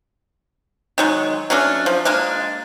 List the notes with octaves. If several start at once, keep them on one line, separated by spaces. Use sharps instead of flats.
D#3 F#3 G#3
F#3 A3 C#4 D4
F3
G#3 A#3 D4